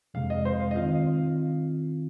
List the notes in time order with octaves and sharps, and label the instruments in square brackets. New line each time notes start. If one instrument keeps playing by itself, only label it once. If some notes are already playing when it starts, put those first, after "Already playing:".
[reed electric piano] F2 C3 G#3 [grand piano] F5
[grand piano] D#5
C5
F5
D#5
[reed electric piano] D#3 C4 F4 [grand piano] F5